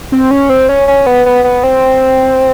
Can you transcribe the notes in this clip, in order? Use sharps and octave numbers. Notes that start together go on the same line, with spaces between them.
C4
C#4
C4
C#4
C#4
B3
B3
B3
C4